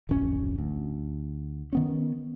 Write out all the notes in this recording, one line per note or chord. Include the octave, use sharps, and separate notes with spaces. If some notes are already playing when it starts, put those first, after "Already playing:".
D1 G#1 F2 C#4
D2
D#3 B3 C#4